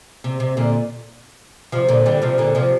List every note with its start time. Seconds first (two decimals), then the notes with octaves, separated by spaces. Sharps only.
0.24 C3
0.40 C3
0.57 A#2 D3
1.72 C3 F3
1.88 A#2 D3
2.06 D3 G3
2.22 C3 F3
2.38 A#2 D3
2.55 C3 F3